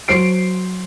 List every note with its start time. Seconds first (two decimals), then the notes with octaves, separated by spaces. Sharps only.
0.08 F#3 C5 C7 D7